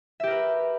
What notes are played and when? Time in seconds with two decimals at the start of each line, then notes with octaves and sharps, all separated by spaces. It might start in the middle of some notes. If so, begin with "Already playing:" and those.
0.20 E5
0.23 G4
0.27 A#4
0.31 B4